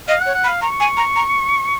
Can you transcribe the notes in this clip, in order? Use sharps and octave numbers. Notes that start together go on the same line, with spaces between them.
D#5 F5
F#5
C#5
F#5
B5
F5
A#5 C#6
G#5
A#5
A#5